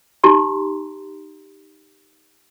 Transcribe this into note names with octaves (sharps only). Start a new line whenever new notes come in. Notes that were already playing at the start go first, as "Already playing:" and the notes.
D#4 G4 A#5 C6